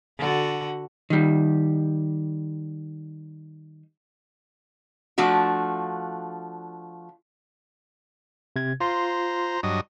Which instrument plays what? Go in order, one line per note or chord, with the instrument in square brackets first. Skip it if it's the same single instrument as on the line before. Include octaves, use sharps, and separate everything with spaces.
[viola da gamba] D3 F#4
[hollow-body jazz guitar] D#3 G3
[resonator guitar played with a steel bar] F3 A3 D4 F#4
[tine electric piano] C3 G#6
[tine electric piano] F4 C6 [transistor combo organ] C5 A#5
[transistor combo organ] G2 F#3 D#5